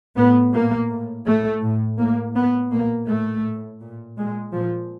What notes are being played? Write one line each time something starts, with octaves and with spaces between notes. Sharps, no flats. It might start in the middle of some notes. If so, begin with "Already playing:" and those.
A2 B3
A#2 A#3
A2
A2 A3
A2
A2 A#3
A2 B3
A#2 A#3
A2 A3
A2
A#2
A#2 G#3
A#2 F3